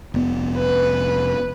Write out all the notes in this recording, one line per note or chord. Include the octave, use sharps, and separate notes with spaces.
F1 B3
B4